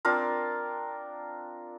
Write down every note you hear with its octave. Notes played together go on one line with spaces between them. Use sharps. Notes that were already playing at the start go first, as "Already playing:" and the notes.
C4 D4 F4 A#4